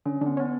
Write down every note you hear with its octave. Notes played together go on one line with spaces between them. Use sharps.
D3 C#4
D3 B3
B3 C#4